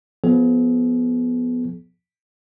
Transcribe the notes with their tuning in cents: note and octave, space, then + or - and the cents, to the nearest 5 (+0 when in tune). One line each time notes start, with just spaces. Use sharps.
F3 +5 B3 +0 G#4 +45